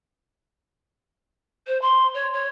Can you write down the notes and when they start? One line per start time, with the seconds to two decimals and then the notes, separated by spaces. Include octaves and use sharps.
1.67 C5
1.81 C6
2.14 C#5
2.33 C#5